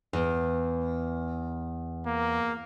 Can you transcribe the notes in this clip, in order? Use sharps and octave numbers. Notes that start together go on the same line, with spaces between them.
E2
A#3